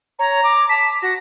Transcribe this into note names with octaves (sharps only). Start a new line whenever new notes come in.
C#5 A#5
D6
A5 B6
F#4 A#6